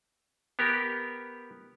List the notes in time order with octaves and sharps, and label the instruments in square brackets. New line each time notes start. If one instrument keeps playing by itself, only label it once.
[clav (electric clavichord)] B3 G4 A#4